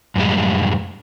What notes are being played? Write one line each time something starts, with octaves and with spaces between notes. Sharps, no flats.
F#2 A2 G3 G#3